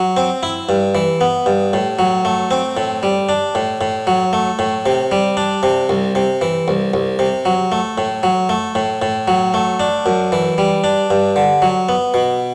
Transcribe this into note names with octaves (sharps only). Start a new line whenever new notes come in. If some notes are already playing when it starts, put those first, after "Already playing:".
Already playing: F#3
C4
E4
G2
E3
B3
G2
A2
F#3
A3
C4
A2
G3
D4
A2
A2
F#3
A3
A2
C3
G3
D4
C3
C2
C3
E3
C2
C2
C3
F#3
A3
A2
F#3
A3
A2
A2
F#3
A3
D4
F#2
E3
G3
D4
G2
D3
F#3
B3
B2